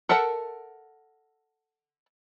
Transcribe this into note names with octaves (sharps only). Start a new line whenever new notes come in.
A4 A#4 E5 F#5 A5